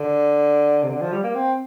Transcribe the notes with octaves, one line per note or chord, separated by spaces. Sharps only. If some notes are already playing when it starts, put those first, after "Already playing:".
Already playing: D3
C3
D3
F3
G3
A#3
C4